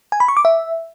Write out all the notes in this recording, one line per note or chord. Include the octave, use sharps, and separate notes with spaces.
G#5
B5
C#6
D6
E5